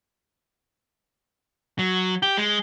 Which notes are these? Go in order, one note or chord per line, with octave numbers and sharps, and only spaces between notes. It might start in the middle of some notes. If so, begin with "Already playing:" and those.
F#3
G4
G#3